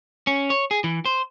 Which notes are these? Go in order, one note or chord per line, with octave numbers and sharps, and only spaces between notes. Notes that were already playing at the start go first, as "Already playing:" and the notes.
C#4
C#5
G#4
E3
C5